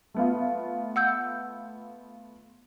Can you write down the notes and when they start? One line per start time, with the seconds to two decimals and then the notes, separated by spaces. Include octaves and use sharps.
0.14 A3 B3 F4
0.96 F#5 E6 G6